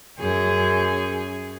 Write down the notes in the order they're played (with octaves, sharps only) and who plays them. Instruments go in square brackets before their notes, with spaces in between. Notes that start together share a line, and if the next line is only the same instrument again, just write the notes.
[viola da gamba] F#2 G#4